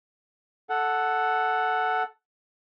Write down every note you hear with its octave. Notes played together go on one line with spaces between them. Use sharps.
A4 F#5